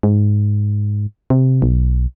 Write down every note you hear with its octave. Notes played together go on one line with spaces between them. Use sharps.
G#2
C3
B1